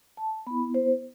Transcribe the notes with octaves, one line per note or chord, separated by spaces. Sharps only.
A5
B3 E4 B5
C5